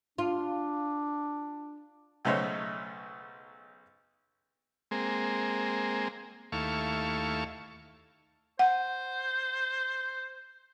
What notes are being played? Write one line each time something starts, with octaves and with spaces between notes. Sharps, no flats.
D4 F4
B1 C#3 A3 D#4 C5 C#5
G#3 A#3 C4
D#2 A3 E4 F5 C#6
C5 F#5